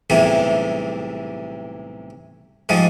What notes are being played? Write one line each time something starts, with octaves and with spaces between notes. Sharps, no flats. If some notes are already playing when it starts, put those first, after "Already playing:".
B1 E2 A2 C3 E3 G3
G#2 F3 G3 G#3